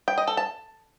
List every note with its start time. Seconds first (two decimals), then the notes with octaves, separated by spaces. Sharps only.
0.08 G5
0.18 D#5
0.27 A4
0.37 A5